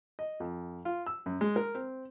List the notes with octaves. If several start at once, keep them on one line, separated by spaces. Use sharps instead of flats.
D#5
F2
F4
E6
F#2
G#3
A#4
C4